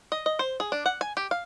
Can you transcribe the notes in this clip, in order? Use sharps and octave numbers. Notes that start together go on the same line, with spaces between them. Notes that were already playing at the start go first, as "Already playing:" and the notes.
D#5
D#5
C5
G#4
D4
F#5
G#5
G4
F5